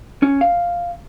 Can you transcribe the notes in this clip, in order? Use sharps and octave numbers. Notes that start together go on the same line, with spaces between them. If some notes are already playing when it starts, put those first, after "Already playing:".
C#4
F5